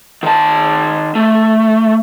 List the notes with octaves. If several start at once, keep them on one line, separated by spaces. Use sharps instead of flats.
D#3 A5
A3